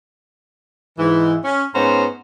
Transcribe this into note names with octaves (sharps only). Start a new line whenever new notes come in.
G#2 E3
C#4
G#2 B3 C#4 C5 A#5